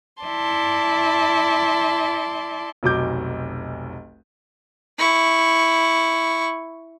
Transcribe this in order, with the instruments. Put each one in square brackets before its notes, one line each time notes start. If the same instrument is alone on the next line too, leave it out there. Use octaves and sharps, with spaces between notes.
[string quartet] E4 D5 A5 C6
[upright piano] F1 B1 F#3 D6 G6
[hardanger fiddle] E4 C#6